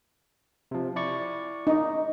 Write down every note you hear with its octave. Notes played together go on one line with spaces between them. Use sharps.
C3 F3
E4 D5 C#6
D#4